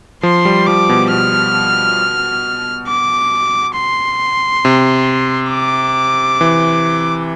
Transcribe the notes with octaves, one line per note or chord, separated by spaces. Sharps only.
F3 C6
G3
F3 D6
B2
B2 F6
D6
C6
C3
D6
E3